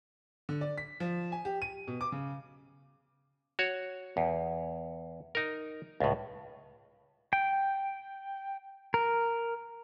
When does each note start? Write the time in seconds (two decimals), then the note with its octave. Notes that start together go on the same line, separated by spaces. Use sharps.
0.49 D3
0.61 D5
0.78 B6
1.00 F3
1.32 G#5
1.45 G4
1.62 D#7
1.88 B2
2.01 D6
2.12 C#3
3.59 F#4 C#5
4.17 E2
5.35 D#4 A#4
6.00 C#2 A2
7.33 G5
8.94 A#4